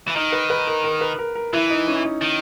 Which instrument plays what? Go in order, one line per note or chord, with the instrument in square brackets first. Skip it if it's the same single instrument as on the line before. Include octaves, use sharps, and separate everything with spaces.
[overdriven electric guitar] E3
[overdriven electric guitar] D#3 [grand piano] D#4
[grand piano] B4
B4
A#4
A#4
B4
A#4
A#4
[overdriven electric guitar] E3 [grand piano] E4
[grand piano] D#4
C#4
D#4
[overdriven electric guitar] D#3